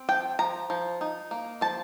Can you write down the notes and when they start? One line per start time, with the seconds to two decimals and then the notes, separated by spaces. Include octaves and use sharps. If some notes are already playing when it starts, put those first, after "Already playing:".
Already playing: C4
0.09 F3 G5
0.39 F3 A#5
0.70 F3
1.01 D#4
1.31 A#3
1.61 F3 A5